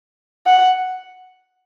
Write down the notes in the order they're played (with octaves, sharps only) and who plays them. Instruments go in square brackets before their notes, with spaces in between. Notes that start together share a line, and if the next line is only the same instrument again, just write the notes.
[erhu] F#5